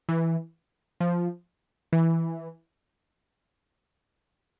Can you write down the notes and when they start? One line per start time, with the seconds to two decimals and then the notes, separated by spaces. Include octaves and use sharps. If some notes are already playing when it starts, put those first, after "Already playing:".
0.09 E3
1.00 F3
1.93 E3